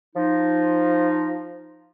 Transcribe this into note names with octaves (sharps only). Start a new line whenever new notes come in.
F3 D#4